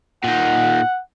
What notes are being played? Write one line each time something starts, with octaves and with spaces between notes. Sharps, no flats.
A#2 D#4 F#5